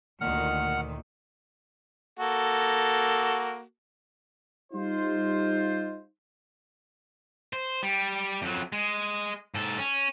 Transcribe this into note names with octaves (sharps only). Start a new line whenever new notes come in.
D2 A#2 D#3 F#5 F6
A#3 F#4 A4
G3 D#4 F4 C5
C5
G3
F2 F#3
G#3
G#2 A4
C#4